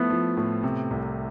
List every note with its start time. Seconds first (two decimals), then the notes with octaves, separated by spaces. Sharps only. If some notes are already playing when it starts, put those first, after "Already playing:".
Already playing: F3 A3 B3 E4
0.10 F3
0.37 A2
0.63 C3
0.91 C2